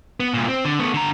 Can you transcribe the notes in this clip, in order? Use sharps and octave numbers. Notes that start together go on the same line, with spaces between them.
B3
C2 A#2
C4
D3
A3 B3
D3 A#5